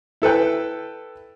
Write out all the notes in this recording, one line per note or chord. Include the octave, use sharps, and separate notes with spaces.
E4 A4 B4 G5